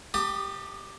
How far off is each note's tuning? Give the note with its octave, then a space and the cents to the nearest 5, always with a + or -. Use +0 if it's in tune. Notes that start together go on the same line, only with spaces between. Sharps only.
G4 +0 A5 +35 D#6 -30